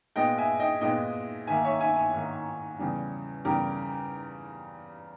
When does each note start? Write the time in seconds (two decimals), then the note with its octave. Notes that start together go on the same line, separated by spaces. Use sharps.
0.16 A#2 G#3 B3 D#5 G5
0.38 E5 G#5
0.60 D#5 G5
0.81 A#2 G#3 B3 D#5 G5
1.47 G#2 D#3 A#3 E5 G#5
1.64 C#5 E5
1.80 E5 G#5
1.96 E5 G#5
2.13 G#2 D#3 A#3
2.79 E2 C#3 G3
3.45 E2 C#3 G3 G4 A#4